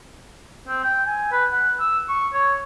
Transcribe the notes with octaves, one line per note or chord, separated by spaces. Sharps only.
C4
G5
G#5
B4
F#5
E6
C#6
C#5